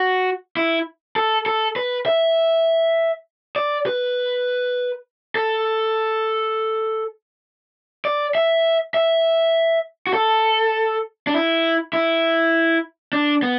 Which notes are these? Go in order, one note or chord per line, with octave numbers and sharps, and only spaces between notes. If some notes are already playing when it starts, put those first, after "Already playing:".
Already playing: F#4
E4
A4
A4
B4
E5
D5
B4
A4
D5
E5
E5
F#4
A4
D4
E4
E4
D4
B3